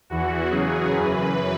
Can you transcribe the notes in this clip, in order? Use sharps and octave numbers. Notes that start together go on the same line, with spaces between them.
E2 E3 F#4
E2 C#3 F#3 G#4
F#2 E3 B4